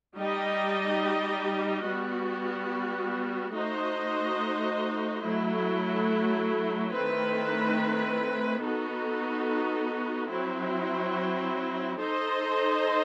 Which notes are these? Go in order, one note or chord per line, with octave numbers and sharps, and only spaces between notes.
G3 D#4 G4 D#5
G3 B3 F#4
A3 D#4 F#4 C5 D#5
F#3 A3 E4
D#3 A3 C4 E4 B4
B3 D#4 F#4 A4
F#3 C4 E4
D#4 A4 C5 D#5